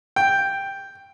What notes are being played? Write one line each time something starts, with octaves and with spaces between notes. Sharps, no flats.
G5